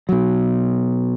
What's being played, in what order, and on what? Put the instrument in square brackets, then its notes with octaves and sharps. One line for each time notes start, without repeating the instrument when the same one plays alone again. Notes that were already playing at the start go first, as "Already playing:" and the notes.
[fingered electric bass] B2 F#3